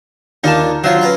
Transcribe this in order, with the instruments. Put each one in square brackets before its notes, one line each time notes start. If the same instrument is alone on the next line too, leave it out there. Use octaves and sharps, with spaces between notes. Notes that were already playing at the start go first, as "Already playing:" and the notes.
[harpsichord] D#2 D4 F4 [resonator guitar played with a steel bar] D#4 A5
[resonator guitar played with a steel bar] F#3 F4 [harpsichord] C5 C#5
[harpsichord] C#4 B4 A#5